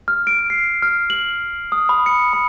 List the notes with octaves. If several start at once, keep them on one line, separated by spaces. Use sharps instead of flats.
F6
D7
C7
F6
F#7
D#6
B5
C#7
B5